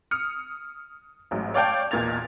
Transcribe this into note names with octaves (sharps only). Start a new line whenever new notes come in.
D#6 F6 C#7
A1 G#2 F#3
C#5 D5 F5 G5 A5 G6
B1 E2 A#2 G#6 A6 F7